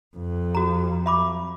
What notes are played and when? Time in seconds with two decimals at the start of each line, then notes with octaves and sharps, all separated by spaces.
0.17 F2
0.55 F#4 A#5
1.06 E5 B5 D6